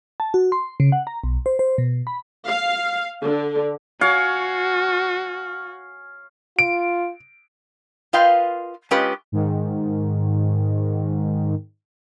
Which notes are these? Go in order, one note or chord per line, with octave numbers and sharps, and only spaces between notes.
A5
F#4
C6
C#3
F#5
A#5
B1
C5
C5
B2
B5
F5
D3
F#4 C#5 F5 G#5
F4 D7
F4 A#4 B4 D#5 F5 G5
G#3 C#4 F4 G4 B4 D#5
G#2 D#3